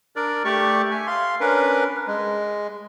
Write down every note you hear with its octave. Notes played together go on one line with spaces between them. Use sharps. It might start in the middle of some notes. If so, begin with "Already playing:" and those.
D4 A#4 D5
A3 G4 D5 C#6
E5 G#5
F5 C6
C#4 D4 A#4 B4
G#3